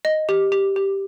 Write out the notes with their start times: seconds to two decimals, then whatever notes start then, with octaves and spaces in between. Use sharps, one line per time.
0.05 D#5
0.29 G4
0.52 G4
0.76 G4